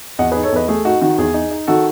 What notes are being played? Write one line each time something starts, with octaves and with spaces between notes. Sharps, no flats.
E2 D#5 F#5
G#4 B4
D#4
A4 C#5
E2 B4 D#5
A3 G#4
D#4 F#4
D#3 F#4
E2 G#4
D#4
D#4
D#3 F#4 A4